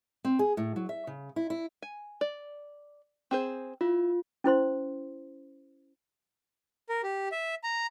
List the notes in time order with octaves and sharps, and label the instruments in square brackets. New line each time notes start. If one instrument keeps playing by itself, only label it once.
[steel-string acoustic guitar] C4
G#4
A2
F#3
E5
C#3
E4
E4
[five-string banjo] G#5
D5
C4 G#4 C5
[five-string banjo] E4 [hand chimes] F4
[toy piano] C#4 E4 C5 C6
[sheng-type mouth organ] A#4
G4
E5
A#5